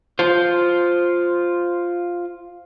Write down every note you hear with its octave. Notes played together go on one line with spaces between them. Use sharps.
F4 C5